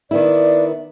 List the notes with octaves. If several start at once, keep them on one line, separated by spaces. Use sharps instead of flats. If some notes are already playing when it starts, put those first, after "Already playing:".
D#3 B3 E4 D5